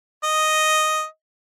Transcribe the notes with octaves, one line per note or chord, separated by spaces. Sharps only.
D#5